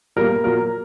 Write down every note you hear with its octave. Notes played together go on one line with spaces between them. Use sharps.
A#2 G3 A#3 A#4
A#2 F#3 A#3 A#4